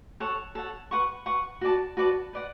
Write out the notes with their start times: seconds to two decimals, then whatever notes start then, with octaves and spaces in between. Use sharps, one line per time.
0.20 A4 C#5 F#5
0.55 A4 C#5 F#5
0.91 B4 F#5 C#6
1.26 B4 F#5 C#6
1.61 F#4 B4 D5 A5
1.97 F#4 B4 D5 A5
2.33 B4 D5 F#5